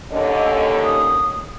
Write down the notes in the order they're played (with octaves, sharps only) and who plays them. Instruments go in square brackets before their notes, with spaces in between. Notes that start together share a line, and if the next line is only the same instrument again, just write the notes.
[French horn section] D#2 D3 C#4 [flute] D#5
[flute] D#6